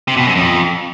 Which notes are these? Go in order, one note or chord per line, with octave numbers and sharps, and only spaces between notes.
C3
B2
F#2
F2